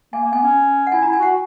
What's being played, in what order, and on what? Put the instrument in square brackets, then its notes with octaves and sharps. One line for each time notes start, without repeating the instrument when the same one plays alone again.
[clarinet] A#3 [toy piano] G#5
[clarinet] A#3
[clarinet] B3 [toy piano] G#5
[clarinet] C#4
[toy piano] F#5
[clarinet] E4 [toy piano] G#5
[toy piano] A#5
[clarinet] E4
[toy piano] G#5
[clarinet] F#4 [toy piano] F#5